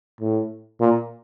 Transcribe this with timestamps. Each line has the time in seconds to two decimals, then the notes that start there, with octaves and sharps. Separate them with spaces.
0.21 A2
0.81 A#2